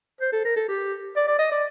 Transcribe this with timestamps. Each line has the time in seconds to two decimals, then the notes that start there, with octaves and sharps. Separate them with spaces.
0.21 C5
0.32 A4
0.45 A#4
0.56 A4
0.69 G4
1.16 D5
1.28 D5
1.39 D#5
1.52 D5